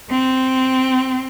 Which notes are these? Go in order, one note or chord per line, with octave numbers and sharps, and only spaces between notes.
C4